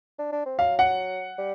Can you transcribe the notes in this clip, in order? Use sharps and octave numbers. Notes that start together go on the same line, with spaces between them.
D4
D4
C4
F#3 F5
F#5
G3